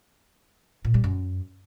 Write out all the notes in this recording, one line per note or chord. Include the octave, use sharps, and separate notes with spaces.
A#2
G3
F#2